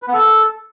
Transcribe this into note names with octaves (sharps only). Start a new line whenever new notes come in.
B4
B3
A4